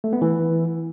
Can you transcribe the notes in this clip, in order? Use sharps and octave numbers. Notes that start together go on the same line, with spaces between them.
A3
B3
E3